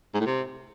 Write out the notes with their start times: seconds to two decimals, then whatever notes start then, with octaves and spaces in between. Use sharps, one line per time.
0.14 G#2
0.20 A2
0.26 C3